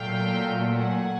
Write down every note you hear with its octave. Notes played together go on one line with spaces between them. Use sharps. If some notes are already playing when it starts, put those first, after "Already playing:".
Already playing: A#2 F#3 A3 F5 G5
F#5 G#5